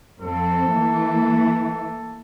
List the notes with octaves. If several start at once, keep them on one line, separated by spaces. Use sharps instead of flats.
F2 C4 A4
E3 A3 A#3